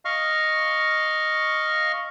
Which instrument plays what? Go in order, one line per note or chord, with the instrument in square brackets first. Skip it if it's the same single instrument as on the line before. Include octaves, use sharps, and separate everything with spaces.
[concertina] D#5 F5 C#6 F6